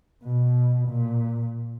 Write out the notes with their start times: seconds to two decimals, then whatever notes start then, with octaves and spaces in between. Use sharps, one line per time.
0.24 B2
0.88 A#2